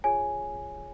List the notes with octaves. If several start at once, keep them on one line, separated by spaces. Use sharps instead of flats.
F4 G#4 C#5 G#5